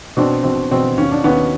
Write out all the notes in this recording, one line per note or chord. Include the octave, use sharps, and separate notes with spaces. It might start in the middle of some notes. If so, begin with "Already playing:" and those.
B2 C4 D4
B2 C4
B2 C4
D#2 C#4
D4
D#2 B3 C#4